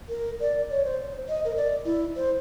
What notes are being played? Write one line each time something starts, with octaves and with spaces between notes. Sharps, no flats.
A#4
D5
C#5
C5
D#5
A#4
D5
E4
C5